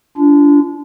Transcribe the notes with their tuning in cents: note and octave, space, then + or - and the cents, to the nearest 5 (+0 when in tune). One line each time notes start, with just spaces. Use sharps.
D4 -30 F4 -35